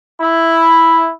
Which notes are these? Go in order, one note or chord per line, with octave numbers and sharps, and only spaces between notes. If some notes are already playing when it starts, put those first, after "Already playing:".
E4